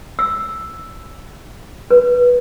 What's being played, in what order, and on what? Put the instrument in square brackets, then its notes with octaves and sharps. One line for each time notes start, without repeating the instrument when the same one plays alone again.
[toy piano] E6
B4